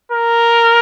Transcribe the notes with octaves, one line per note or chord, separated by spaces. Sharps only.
A#4